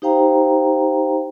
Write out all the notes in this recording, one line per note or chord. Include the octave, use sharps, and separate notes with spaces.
D#4 G4 C5 F5 G5 A#5